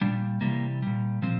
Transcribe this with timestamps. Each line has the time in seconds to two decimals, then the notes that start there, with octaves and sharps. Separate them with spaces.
0.01 A#2 G3 D4
0.41 C3 E3 G3 A#3
0.82 A#2 G3
1.22 A#2 F3 C4